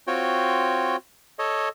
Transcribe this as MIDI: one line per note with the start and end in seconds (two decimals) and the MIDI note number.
0.07 0.96 60
0.07 0.96 65
0.07 0.96 66
0.07 0.96 73
0.07 0.96 79
1.39 1.69 69
1.39 1.69 73
1.39 1.69 75